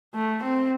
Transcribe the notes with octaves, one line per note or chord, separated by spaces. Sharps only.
A3
C4